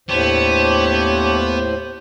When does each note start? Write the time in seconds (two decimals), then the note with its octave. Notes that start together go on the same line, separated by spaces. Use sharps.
0.09 D#2 A2 B3 D4 G4 C5 C#5